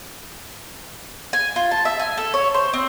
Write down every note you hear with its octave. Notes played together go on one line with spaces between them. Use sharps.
G#5
F4
A5
E5
G#5
A4
C#5
C5
C4